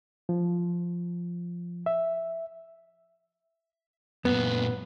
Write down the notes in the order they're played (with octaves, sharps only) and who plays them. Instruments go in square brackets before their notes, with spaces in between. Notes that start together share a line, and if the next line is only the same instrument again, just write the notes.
[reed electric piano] F3
E5
[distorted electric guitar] F#2 A#2 [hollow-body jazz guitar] B3